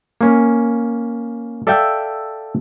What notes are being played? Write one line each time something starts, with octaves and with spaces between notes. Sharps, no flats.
A#3 C#4
A4 D5 E5 F5 G5